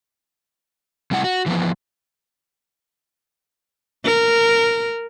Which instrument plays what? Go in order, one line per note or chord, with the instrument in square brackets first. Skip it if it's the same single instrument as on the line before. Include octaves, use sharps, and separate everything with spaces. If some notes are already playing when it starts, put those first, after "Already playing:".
[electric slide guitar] C3 G3 A3 E4 F#5
F#4
E3 F3 B3
[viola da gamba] A#4